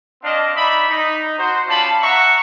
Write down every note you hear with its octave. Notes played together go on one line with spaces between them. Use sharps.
C4 D4 D#5 F5
D#4 D5 E5 B5
D#4
F#4 C5
C#4 F4 D5 A5 B5
E5 F#5 A#5 C#6